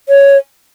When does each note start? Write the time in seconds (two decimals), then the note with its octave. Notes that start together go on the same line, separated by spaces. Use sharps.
0.09 C#5